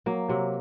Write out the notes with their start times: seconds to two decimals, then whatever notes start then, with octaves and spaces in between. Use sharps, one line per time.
0.06 F#3 A#3
0.29 C3 F#3